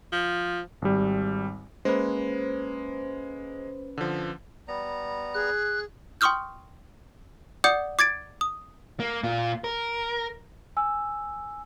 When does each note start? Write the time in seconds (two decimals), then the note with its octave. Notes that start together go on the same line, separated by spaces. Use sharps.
0.12 F3
0.82 G#1 G3
1.85 G#3 A#3 C#4 B4 C5
3.97 D3 F3
4.68 G3 B3 A#5
5.34 G#4 F#6
6.21 G5 C6 C#6 D#6 F6 G6
7.64 D5 F#5 D6 D#6 G6 C#7
7.99 D6 G#6 A6 D7
8.41 D#6
9.00 A#3
9.23 A#2 F4
9.64 A#4
10.77 G#5 E6